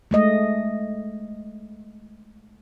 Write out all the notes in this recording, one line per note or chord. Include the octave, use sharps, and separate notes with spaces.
G#3 A3 D#5